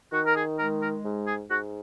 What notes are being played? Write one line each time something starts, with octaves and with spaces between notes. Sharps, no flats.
D#3 F#4
A#4
G#4
G#3 A#4
A#4
G#2
G#4
G#2 F#4